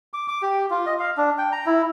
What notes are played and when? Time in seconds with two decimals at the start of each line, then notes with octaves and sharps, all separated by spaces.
0.13 D6
0.28 D6
0.42 G4
0.70 F4
0.86 D#5
0.99 F5
1.17 D4
1.38 G5
1.52 A#5
1.66 E4